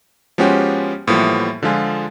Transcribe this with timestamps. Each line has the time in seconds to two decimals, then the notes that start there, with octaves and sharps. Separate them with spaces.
0.38 F3 G#3 B3 C#4 F#4 G4
1.07 A2 E3 F3 G3 A#3 B3
1.62 D3 F3 G#3 F4 G#4